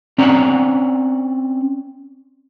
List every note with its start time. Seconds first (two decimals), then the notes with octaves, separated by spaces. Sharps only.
0.18 C4 C#4 D5 F#5 A#5